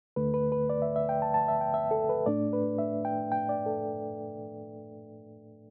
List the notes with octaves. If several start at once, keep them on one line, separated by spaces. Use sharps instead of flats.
D2 D3 A3 B4
B4
B4
D5
E5
E5
G5
A5
A5
E5
G5
E5
A4
B4
A2 A3 D4 D5
B4
E5
G5
G5
D5
A4